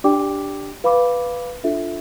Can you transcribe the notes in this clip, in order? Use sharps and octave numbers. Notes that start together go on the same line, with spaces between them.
D4 G4 D5 G5 D6
B4 F5 B5 D6
D4 F4 A4 E5